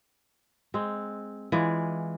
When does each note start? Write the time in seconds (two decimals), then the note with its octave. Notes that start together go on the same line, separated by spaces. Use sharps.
0.74 G#3 C4
1.52 E3 G#3 F4 D5